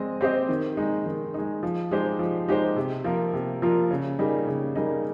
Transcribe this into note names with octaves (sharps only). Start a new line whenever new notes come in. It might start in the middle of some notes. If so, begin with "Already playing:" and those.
Already playing: G#3 C4 D#5
C4 G4 C5 D#5
D#3
G#3 D#4
D#3
G#3 D#4
F3
G#3 D#4 G4 C5
F3
G#3 D#4 G4 C5
C3
F3 A#3 F4 A#4
C3
F3 A#3 F4 A#4
C#3
G3 A#3 D#4 G#4
C#3
G3 A#3 D#4 G#4